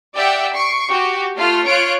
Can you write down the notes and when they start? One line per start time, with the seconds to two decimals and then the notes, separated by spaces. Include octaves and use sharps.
0.16 G4 D5 E5 F#5 G5
0.53 C#6 C7 D7
0.89 F#4 G4
1.36 A3 F4 F6
1.66 F4 C#5 C#6 F#6 D7